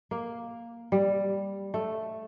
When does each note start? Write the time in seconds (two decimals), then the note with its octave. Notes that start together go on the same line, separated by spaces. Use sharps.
0.11 A#3
0.92 G3
1.74 A3